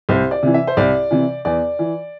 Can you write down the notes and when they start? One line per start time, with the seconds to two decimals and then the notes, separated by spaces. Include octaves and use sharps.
0.09 C2 C5
0.31 D5
0.43 C3 E3
0.54 E5
0.67 C5
0.77 C2 D5
1.11 C3 E3
1.45 E2 D5
1.79 E3